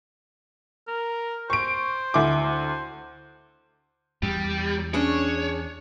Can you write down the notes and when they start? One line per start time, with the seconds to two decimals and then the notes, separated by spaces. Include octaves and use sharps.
0.88 A#4
1.50 C5 C#6 D7
2.14 D2 E4 D6
2.44 C5
4.23 E2 G3
4.94 C#4 D4 G#4 C#5